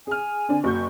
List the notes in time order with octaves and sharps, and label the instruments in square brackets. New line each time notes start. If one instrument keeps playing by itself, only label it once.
[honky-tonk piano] G#4 F6 [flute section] G#5
[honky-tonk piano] D3 C4 D4
[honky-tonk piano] F#1 F#4 G6 [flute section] C#6